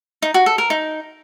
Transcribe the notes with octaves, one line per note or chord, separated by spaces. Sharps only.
D#4
F#4
A4
A#4
D#4